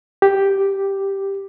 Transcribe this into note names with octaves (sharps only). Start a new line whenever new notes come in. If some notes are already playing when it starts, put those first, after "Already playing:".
G4